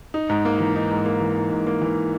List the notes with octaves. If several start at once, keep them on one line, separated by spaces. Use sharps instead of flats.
D#4
G#2
A#3
E3
D#4
G#2
A#3
E3
D#4
G#2
A#3
E3